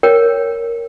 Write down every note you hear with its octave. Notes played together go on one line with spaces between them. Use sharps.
A#4 C#5 G5